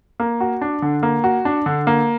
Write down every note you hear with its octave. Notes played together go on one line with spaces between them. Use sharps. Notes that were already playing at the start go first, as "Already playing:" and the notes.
A#3
F#4
D4
D3
A#3
F#4
D4
D3
A#3